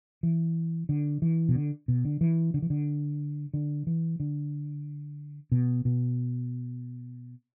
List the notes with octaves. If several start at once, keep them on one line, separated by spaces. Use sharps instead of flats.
E3
D3
E3
B2
D3
B2
D3
E3
D3
E3
D3
D3
E3
D3
B2
B2